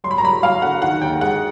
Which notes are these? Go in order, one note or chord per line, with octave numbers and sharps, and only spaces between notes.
F#3 C6
B5
A#5
F#3 B5
F#3 F5
D3 F#5
D#3 F#5
D#2 G5
G#3 F#5